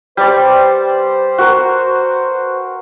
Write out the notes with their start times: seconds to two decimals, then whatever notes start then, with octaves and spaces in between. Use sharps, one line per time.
0.17 G3 B4 C5 D5
1.38 F#4 A#4